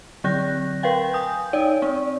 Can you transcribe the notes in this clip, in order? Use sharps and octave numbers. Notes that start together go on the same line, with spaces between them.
D3 F#3 C4 F#6 G6 A#6
A#4 B4 F5 G5
G#5 D#6 G6
D#4 C#5 D5 G5
C4